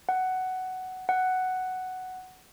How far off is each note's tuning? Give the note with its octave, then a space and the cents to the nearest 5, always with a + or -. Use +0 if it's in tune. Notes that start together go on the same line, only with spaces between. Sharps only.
F#5 +10
F#5 +5